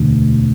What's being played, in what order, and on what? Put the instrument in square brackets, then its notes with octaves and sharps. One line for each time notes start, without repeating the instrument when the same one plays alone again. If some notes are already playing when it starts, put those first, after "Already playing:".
Already playing: [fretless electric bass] E1 D2 D3